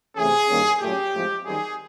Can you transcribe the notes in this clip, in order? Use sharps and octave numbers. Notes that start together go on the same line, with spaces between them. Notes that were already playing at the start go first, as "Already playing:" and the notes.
C3 E3 A3 C#4 G#4
G2 D#3 G3 A#3 C#4
A#2 F#3 A3 C#4 G4
A2 F3 G#3 C4
F#2 D#3 G3 C4 G#4